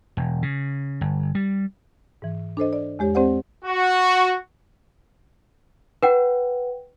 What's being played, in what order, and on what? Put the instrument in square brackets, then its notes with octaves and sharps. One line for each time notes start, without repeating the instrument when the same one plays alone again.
[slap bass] E1
C#3
G1
G3
[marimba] G#2 E3
D4 A4 C5 D#5
D5
E2 G#3 G4 C#5
G#3 C4 G4 C5 D5 F#5
[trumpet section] F#4
[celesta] B4 F#5 G5